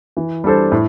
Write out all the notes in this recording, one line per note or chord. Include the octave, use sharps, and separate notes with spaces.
E3
G3 D4 A4 C5
A2